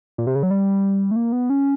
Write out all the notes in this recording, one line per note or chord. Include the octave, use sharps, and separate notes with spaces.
A#2
C3
C#3
F#3
G3
A3
A#3
B3
C#4